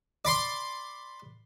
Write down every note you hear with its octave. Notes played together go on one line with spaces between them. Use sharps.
D5 B5 C6